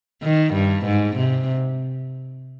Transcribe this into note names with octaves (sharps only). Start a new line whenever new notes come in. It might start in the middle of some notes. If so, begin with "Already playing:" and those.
D#3
G2
G#2
C3